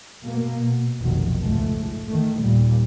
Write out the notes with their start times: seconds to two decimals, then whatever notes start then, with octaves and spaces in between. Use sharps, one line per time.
0.23 B2 A#3
0.63 B2
1.01 F1 B1 B2 D#3 F#3
1.41 C#2 G#2 A3
2.10 D#3 A3
2.42 D#2 A#2 G3